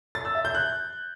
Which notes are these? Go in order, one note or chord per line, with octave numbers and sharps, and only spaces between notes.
A6
E6
E5
G6
F#6